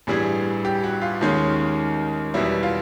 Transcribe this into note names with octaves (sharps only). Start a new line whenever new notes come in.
A1 G2 E3 G3 G#4
G4
F#4
F4
D#2 D#3 G#3 C#4
E2 B2 G3 E4
F4